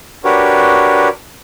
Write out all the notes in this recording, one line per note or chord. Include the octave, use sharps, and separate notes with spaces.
D4 F#4 G4 A#4 B4 C#5